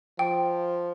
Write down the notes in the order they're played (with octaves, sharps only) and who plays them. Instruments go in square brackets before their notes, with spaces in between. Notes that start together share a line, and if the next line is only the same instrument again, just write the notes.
[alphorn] F3 [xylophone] G5